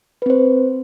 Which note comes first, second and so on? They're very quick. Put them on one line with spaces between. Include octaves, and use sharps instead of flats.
B4 C4 C5